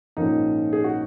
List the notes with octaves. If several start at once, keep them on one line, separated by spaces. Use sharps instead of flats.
A#1 G#2 F3 A#3 C#4 D#4
G#4
F#4